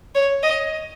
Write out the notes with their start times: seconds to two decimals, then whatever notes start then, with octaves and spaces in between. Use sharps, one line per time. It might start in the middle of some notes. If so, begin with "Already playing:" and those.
0.15 C#5
0.43 D#5